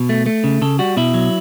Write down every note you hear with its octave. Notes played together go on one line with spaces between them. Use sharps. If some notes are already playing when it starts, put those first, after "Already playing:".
Already playing: B2
A3
A3
C#3
C#3 A4
G3 F#4
B2 E4
F#3